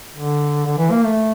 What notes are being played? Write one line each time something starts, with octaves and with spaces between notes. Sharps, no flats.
D3
D3
E3
A#3
A3